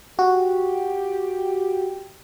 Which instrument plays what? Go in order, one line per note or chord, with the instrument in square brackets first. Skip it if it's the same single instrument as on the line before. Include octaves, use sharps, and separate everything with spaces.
[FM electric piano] F#4 [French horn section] G4